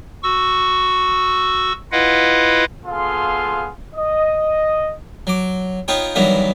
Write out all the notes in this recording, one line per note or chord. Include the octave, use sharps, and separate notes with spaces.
F#4 C#6 E6
E4 F4 B4 D#5 F5 F#5
B3 F4 G#4 A4 F5 C6
D#5
F#3 D6
B3 D#4 F4 C#5 G5
G2 D#3 E3 F#3 B3